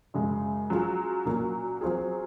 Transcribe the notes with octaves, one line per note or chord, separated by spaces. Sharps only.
F#2 C#3 G#3
F#3 C#4 F4 G#4
A#2 F#3 A#3 C#4
F#3 C4 F4 G#4